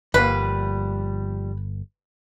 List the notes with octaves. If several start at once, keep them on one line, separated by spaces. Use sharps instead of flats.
G1 F3 G3 A#3 B4